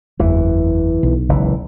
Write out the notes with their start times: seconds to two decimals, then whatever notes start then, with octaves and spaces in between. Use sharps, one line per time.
0.19 F#1 E2 E3
1.03 B1
1.29 F#1 C#2 E3